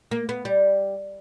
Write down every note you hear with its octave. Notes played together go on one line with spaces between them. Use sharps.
A#3
B3
G3